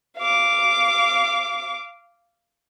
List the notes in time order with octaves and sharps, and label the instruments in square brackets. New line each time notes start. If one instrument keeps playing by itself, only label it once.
[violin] F5 D6